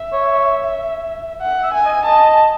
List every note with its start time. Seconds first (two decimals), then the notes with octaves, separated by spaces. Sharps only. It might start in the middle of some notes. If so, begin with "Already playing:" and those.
Already playing: E5
0.13 C#5
1.42 F#5
1.63 E5
1.74 G#5
1.85 D#5
2.06 D#5 A5